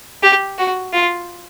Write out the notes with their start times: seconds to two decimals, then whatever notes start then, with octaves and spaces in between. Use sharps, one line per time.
0.23 G4
0.59 F#4
0.93 F4